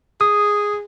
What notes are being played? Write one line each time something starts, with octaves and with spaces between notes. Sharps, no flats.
G#4 D#6